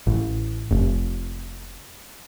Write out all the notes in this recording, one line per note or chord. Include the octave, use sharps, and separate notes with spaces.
A1
F1